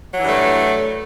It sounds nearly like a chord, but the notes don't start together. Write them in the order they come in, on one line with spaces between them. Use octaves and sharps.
F#3 E3 G2 A3